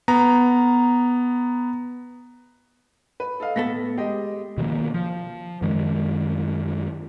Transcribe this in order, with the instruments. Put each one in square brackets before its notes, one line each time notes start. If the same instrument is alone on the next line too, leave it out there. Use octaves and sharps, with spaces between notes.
[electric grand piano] B3 A#5
[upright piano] B4
A4 D#5 F5
[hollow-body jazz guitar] A2 B3 A4 [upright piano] A#6 B6
[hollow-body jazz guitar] G#3 [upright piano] G4 D#5
[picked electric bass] B2 D#3 F3 A#3
F3
F#2 D#3 G#3